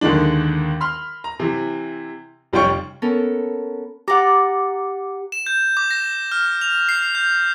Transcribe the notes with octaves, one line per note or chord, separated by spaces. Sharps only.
D#2 D3 D#3 G#3 D4
B5 C6 F6
A#5
C3 E3
F1 G3 C#4 F4 G5 C#6
B3 C#4 A4 A#4
G4 D5 F#5 A#5
E7
G6
D6
A#6
F6
F7
C7
G6